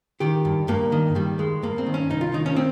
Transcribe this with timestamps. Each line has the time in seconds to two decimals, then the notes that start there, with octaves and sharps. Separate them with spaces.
0.20 D#3 G4
0.45 G2
0.68 G2 A#3
0.92 D#3
1.15 D#3 G3
1.38 G2 G#3
1.62 G2 A#3
1.78 C4
1.86 D#3
1.94 C#4
2.10 C2 D#4
2.21 F4
2.33 D#3 D#4
2.46 C#4
2.56 C4